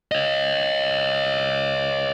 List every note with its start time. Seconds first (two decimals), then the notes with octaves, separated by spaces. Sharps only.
0.12 C#5 D#5